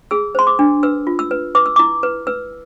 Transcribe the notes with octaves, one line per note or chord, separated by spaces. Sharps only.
G#4 E6
C5 C6
D6
D4
B4 E6
F4
E6
B4
B4 D6
E6
E4 D6
B4
B4 E6